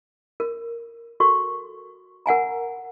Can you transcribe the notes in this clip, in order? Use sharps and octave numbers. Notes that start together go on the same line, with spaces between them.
A#4
F#4 A4 A#4 C#6
A#4 F#5 G#5 A#5